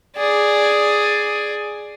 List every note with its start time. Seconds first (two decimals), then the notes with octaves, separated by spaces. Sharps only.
0.16 G#4 D5